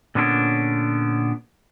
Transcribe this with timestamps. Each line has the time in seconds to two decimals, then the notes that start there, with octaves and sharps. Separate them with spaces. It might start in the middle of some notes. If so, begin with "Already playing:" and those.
0.15 A#2 D3 B3 C#4 D4 C#5